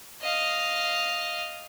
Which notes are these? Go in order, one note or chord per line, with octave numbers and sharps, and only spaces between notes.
D#5 F5